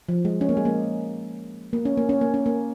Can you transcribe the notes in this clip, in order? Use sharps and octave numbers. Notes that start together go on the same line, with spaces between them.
F3
G#3
C#4
A#3
G#3
A#3
A#3
C#4
A#3
C#4
A#3
C#4
A#3